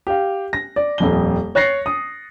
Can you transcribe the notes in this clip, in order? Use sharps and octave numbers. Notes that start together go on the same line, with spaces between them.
G4 F5
A#6
D5
D#1 F2 G7
C#5 F#6 A6 A#6 C7 C#7
D#6